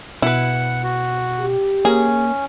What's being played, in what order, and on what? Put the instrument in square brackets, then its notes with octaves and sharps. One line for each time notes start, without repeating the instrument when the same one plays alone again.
[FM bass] B2 [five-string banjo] E4 B4 [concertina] F#5
[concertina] F#4
[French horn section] G4
[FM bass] A#3 [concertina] C#4 [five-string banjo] G#4